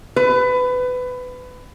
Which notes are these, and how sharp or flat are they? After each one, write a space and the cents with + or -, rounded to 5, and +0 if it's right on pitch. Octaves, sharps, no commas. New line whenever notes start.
B4 +20